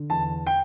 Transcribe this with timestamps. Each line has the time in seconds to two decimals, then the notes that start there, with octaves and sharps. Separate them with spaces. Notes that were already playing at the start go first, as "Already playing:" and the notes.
Already playing: D3
0.10 E2 A5
0.47 G5